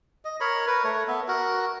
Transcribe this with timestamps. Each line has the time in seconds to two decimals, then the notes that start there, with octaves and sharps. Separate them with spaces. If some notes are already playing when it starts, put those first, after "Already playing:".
0.25 D#5
0.40 A#4 C#5 B5
0.67 A#4 B4
0.84 A3 C#5
1.08 B3 E5
1.28 F#4 A#4